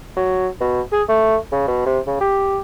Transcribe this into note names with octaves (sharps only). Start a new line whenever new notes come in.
F#3
B2
G#4
A3
C#3
B2
C3
C#3
G4